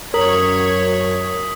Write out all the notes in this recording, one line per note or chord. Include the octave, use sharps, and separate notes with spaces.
F#2 A#4 C#5 D#6 B6 F#7